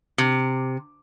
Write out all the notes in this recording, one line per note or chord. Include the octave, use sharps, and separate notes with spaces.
C3